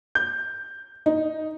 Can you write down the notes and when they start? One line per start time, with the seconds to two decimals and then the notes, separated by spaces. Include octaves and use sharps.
0.15 G6
1.06 D#4